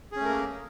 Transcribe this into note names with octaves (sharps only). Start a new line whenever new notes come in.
A3 A#3 C#4 G#4 A#4